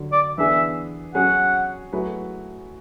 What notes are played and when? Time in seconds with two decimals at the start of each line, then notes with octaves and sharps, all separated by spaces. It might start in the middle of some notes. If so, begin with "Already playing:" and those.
Already playing: D3 F#3
0.12 D5
0.38 E3 B3 D4 G#4 E5
1.15 F#3 C#4 G#4 F#5
1.93 F#3 A3 E4 G#4 B4